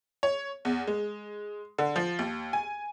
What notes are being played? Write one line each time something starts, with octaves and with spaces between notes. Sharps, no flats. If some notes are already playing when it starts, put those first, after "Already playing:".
C#5
E2
G#3
D3
F3
D#2
G#5